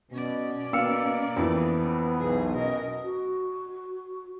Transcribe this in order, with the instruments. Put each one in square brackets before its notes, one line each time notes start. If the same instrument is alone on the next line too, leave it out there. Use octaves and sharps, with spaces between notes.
[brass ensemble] B2 [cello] C#4 D5
[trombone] B2 [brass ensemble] A#3 [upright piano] F5 E6 C#7
[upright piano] F2 E3 [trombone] B3
[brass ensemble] B1 [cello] G#4
[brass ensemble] B2 D#5 [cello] C#4 A#4
[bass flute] F#4